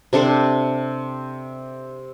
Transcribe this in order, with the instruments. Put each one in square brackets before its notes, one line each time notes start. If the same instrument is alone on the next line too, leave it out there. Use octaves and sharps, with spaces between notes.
[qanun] C3 D4 A4 C5